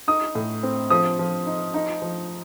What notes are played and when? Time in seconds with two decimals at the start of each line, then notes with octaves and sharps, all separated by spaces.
0.08 D#4 D#6
0.35 A2
0.63 C4
0.90 F3 D#6
1.19 F3
1.46 D#4
1.74 D#4
2.02 F3